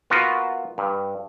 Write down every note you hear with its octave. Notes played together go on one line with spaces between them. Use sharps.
B3 F4 F#4 A#4
G2